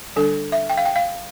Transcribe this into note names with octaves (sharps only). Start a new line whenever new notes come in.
D3 G3 D4 A4
E5
G5
F5
G5
F5